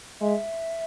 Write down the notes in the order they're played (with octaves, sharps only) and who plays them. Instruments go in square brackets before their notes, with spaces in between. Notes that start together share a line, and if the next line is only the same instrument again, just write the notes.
[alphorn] G#3 [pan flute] E5